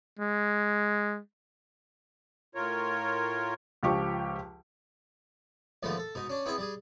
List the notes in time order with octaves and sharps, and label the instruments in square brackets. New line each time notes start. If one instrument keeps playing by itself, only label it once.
[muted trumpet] G#3
[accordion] A2 F4 A#4 C#5
[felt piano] C#2 F3 G4 C#6 D6
[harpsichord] D#2 G#2 D3 F3 A3 B3
A4
G#2 B2 D#4
C#4 D4
B3 C4 E4 G#4 D#5
G3 G#4